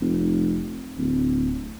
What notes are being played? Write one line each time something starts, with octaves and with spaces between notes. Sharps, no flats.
F1
D1